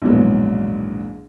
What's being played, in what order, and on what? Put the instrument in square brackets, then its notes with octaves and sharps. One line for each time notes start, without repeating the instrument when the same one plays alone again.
[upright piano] A#1 E2 G#2 B2 F#3 G#3